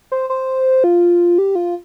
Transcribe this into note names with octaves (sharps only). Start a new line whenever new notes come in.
C5
C5
F4
G4
F4